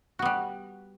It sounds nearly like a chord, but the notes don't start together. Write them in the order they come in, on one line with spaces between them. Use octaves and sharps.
F#4 B3 G3